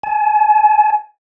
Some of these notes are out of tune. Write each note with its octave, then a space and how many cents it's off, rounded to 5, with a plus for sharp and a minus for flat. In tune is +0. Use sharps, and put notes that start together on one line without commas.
G#5 +40